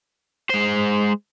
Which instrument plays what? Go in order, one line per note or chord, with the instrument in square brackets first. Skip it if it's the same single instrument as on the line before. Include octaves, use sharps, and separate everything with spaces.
[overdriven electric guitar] G#3 C5